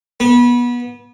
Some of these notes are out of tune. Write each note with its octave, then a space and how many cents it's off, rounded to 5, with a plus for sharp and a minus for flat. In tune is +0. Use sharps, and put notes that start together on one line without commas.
B3 -25